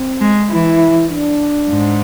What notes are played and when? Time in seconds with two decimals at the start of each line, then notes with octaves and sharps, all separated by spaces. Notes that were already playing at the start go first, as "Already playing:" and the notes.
Already playing: C4
0.21 G#3
0.50 E3 E4
1.10 D4
1.69 G#2